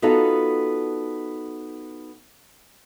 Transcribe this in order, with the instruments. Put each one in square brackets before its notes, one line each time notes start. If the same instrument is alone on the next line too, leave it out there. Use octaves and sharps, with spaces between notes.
[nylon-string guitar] B3 D#4 F4 F#4 A4